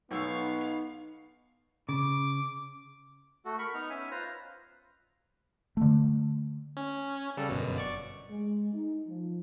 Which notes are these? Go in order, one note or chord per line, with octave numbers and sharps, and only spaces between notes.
B1 B3 D#4 F5 C#6 E6
C#3 D6
A3 F#4 A4
A#4 B5 C#6
B3 D#4 F6
C#4 E5 G#5
F4 B4 C5 A#5
D3 A3
C#4
C#3 G3 A4
G1 F#2 B2
D5 C#6
G#3
D#4
F3